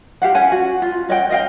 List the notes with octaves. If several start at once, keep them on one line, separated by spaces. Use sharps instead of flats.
G4 F5 F#5
C#4 F#5 G#5
F#4
F4
C#4 D#5 F#5 G5
D#5 F5 G5